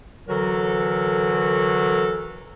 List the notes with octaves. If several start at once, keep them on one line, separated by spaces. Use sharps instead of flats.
D3 E3 F#3 F#4 A4 A#4